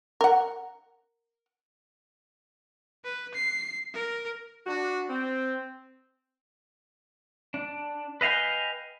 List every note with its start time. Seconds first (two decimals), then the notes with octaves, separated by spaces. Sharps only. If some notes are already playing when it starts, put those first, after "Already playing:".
0.21 A#4 F#5
3.04 B4
3.34 C7
3.93 A#4
4.67 D4 F#4
5.09 C4
7.54 D4
8.21 B4 D#5 F5 G5 G#5